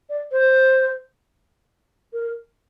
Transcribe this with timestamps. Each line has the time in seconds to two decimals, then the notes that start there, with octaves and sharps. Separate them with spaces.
0.10 D5
0.32 C5
2.13 A#4